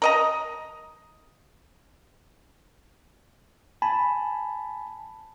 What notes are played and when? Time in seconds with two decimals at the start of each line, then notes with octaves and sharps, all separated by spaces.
0.02 A#4 D#5 A#5
3.82 G#5 A5 B5